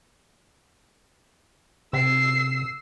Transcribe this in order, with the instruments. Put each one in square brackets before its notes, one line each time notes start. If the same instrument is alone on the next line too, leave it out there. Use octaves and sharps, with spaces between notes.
[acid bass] C3 [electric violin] E6 C7